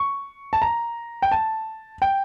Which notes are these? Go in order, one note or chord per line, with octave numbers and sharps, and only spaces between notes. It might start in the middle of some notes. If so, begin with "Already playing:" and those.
Already playing: C#6
A5
A#5
G5
A5
G5